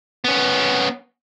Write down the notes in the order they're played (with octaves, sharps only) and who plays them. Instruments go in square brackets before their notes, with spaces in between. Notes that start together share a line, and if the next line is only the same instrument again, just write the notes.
[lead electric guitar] B3 C#4